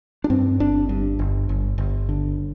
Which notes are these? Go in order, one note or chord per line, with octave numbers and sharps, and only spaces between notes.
D4
G2 C4
G1 D4
G2
G1
G1
G1
D3